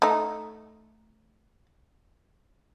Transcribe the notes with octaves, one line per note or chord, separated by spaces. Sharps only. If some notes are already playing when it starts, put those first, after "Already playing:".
A3 D#4